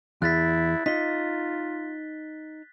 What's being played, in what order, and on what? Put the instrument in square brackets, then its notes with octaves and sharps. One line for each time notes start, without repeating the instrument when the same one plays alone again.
[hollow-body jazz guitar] E2 [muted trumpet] E4 [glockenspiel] F#6 A6 B6
[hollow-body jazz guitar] D#4 [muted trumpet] F4 [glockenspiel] B6 G7